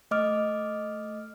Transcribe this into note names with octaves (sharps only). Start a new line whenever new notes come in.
A3 D#5 D6 F6